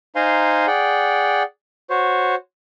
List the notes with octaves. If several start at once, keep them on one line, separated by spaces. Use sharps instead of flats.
D#4 C5 F5 G#5 A#5 C6
G#4 D5 F#5 G5
F#4 C5 C#5